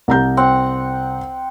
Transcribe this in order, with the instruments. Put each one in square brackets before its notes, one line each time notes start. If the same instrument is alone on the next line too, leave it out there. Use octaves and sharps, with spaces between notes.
[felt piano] C2 A#5 G6
[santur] C4 F#5